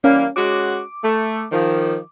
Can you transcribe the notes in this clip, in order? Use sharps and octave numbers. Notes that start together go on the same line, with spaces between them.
E3 G3 A#3 C#4
G#3 C#4 F#4 D6
A3
D#3 F3